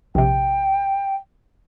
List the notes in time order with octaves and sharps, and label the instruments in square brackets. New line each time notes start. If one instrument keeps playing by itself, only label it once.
[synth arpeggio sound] A#1 C3 [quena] G5